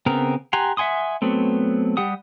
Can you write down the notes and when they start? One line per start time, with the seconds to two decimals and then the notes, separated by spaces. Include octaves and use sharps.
0.06 C#3 B3 C4 A#4
0.53 G4 F#5 G#5 A#5 C6
0.77 E5 F#5 G#5 C6 D#6
1.22 F#3 A3 B3 C4
1.97 G3 G4 F#5 D#6